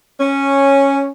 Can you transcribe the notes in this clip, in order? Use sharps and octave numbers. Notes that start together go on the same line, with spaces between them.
C#4